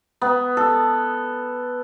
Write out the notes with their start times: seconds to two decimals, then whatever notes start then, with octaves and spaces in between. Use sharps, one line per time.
0.21 B3
0.57 A4